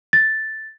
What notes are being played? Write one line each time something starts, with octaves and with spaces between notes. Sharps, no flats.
A6